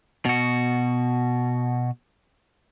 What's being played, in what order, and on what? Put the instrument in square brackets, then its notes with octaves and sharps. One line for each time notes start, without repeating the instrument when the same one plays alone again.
[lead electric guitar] B2 F#4